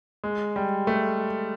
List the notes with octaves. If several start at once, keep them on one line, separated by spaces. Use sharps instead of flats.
G#3
G3
A3